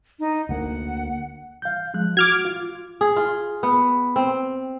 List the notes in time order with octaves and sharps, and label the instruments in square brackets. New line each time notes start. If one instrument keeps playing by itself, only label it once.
[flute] D#4
[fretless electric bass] D2 A#3 [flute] F#5
[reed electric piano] F5 G6
F3 G#3 F#6
[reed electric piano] F#4 [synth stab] D6 F6 G#6
[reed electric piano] F4
[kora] G#4
F4
B3
C4